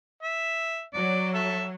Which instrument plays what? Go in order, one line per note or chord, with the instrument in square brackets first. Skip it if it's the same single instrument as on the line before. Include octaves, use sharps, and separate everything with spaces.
[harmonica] E5
[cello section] F#3 [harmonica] D5
[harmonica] A4 E5